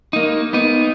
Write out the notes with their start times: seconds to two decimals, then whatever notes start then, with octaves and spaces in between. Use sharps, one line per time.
0.13 A#3 D#4
0.53 B3 D#4